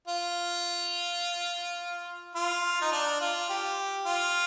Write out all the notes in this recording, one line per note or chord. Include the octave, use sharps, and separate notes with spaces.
F4
F4
D#4
D4
F4
G4
F4